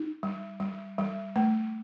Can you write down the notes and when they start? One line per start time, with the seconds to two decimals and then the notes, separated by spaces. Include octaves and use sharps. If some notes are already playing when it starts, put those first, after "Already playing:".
Already playing: D#4
0.23 G3
0.60 G3
0.98 G3
1.36 A3